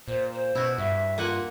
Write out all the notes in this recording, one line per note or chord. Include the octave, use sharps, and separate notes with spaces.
A#2 C5
C5
B2 E4 F#4
G2 E5
A#3 F4 F#5 G#5